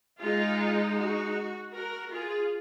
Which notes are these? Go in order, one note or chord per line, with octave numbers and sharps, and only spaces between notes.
G#3 D#4 F4 G#4
F#4
F#4 A#4
F4 G#4